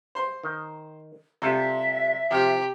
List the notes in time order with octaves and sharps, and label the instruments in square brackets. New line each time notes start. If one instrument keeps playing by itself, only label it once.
[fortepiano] C5 C6
[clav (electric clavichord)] D#3
[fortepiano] C3 [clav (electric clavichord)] G3 F4 A4 [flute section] E5
[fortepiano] C3 [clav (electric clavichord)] F3 [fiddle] G4